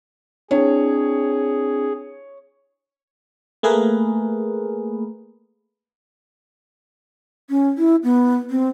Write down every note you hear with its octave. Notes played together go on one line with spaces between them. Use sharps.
C4 D4 E4 G#4 C#5
A3 A#3 G#4 A#4 B4
C#4
E4
B3
C4